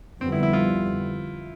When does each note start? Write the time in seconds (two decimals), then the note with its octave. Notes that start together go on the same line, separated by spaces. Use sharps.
0.21 F2 D3 G3 B3 C4
0.32 E4
0.43 E4
0.53 F4